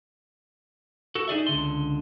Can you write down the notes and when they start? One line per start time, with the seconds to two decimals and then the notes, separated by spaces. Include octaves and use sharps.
1.15 F#4 A4
1.28 D#4 G#4 D5 E5
1.47 C#2 D3 C6